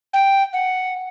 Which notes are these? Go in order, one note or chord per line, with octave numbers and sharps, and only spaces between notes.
G5
F#5